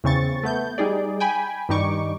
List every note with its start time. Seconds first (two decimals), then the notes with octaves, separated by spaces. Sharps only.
0.04 E2 C#3 C4 C#6 A6
0.43 A3 B3 G6
0.78 G3 D#4 G#4 D5
1.20 G5 G#5 B5
1.69 G2 D#3 G3 D#4 C#6 D6